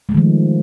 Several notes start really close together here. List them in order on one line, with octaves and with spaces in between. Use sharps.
G#3 A3 D#3 F3